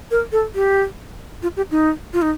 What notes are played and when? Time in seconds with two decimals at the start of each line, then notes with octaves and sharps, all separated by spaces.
0.11 A#4
0.32 A4
0.55 G4
1.43 F4
1.57 G4
1.71 D#4
2.13 F4
2.22 D#4